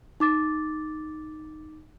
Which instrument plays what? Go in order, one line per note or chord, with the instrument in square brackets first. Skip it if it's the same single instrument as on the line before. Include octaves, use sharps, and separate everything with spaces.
[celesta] D#4 D6 A6